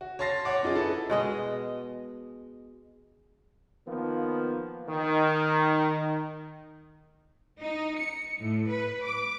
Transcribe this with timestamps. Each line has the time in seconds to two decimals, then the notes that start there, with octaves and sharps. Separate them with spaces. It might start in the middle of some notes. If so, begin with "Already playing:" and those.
0.01 F#4
0.19 C#5 A5 C6 A6 A#6 C7
0.45 C#5 F#5 D6
0.63 F#2 D#4 F4 G#4 A6
0.75 E4 G#4 A4 B4
1.10 B2 G#3 D#5
3.87 D#3 F3 A#3 B3
4.88 D#3
7.61 D#4
7.97 C#7
8.39 A2
8.69 B4
9.04 D6